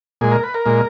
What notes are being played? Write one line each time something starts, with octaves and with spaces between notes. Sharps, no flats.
A#2 G#3 G#4
A#4
B4
A#4
A#2 G#3